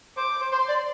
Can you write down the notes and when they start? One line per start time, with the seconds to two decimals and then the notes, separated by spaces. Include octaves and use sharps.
0.17 C5 D6
0.41 C5
0.52 C5 C6
0.69 D5